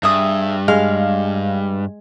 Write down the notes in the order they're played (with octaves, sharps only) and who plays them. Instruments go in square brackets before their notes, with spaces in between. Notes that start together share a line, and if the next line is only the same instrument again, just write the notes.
[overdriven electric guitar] G2 [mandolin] G#4 E5 D#6
[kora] G#3 [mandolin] F5